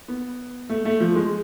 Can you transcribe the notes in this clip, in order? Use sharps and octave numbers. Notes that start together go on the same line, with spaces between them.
B3
A3
A3
F3
G#3